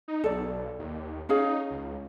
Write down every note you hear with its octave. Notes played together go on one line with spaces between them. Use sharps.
D#4
B1 A4 D5
D#2
C#4 D#4 G#4 F5
C#2